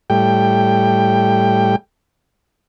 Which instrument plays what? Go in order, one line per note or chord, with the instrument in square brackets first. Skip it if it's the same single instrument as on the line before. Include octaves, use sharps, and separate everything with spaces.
[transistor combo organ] A2 G3 G5